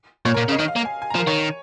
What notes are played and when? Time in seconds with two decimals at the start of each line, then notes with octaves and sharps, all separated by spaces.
0.25 A#2 C#5
0.34 A#4
0.37 A#2
0.49 C#3 D#5
0.59 D#3 D#5
0.68 F5
0.76 A#3
0.85 G#5
1.02 G#5
1.10 A#5
1.15 F3
1.19 A#4
1.27 D#3 C#5